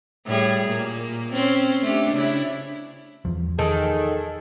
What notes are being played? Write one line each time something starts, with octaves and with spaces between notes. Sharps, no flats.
A2 G3 G#4
A#2 A#3
C4 C#4 C5
A3 D4 G4
C#3 D4 E4
E2 F3
D#3 G#4 A4